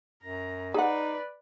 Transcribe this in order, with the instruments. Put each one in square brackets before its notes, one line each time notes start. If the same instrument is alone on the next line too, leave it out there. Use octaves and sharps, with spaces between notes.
[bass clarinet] F#2 [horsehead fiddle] A#5
[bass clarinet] D#4 [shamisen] G#4 F#5 [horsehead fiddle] B4 D5